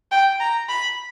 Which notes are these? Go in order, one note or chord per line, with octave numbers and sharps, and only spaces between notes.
G5
A#5
B5